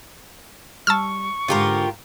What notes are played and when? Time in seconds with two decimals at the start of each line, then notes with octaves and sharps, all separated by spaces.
0.87 G3 A5 C#6 E6 F6
1.48 G#2 D3 F4 G4 A#4